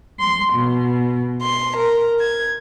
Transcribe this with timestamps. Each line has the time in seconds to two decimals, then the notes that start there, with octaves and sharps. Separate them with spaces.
0.18 C6
0.53 B2
1.41 C6
1.77 A#4
2.18 G#6